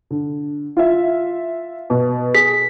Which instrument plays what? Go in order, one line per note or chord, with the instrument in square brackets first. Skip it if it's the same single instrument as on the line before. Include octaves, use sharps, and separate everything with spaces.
[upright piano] D3
F4 E5
B2
[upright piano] G#4 [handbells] B6